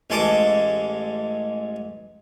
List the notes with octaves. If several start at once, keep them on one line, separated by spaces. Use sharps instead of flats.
A1 G#3 A4 A5 D6